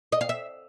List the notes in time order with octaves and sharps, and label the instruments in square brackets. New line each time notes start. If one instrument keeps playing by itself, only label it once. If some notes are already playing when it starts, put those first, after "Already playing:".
[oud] D#5
F5
E5